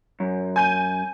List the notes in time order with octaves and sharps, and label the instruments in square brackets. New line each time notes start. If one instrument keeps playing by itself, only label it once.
[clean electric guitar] F#2
[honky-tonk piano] G#5 G6 D#7